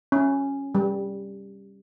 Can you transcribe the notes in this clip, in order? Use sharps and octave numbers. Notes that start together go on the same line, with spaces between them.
C#4
G3